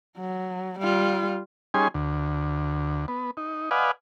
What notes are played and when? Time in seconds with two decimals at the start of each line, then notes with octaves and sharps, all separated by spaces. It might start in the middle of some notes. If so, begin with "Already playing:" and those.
0.17 F#3
0.79 G3 F4
1.74 G3 C#4 D#4 G#4 G#5 C6
1.94 D2
3.08 B3
3.37 D#4
3.71 B4 D5 D#5 F5 F#5 G#5